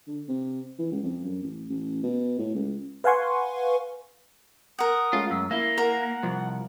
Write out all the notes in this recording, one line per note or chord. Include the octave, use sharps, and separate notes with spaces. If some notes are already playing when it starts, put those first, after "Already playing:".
D3
C3
E3
C#2
F2
F#2
A1
A1
B2
A2
C#2
B4 F5 F#5 G#5 C6 C#6
A#4 F#5 D#6
G#3 A3 C#4 F4
F#2 E6
A#3 E4 E5 F5 G7
A#4 F#5
C2 F3